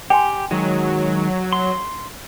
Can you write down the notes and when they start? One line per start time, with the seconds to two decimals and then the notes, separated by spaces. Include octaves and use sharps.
0.10 G4 G5 G#5 C6
0.51 D#3 F#3 G#3
1.52 C6